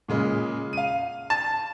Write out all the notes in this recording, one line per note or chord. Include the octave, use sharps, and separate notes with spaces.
A#2 C#3 G#3
F5 D#7
A5